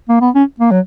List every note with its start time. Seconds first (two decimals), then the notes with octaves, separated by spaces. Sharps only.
0.09 A#3
0.21 B3
0.35 C#4
0.60 A#3
0.71 F#3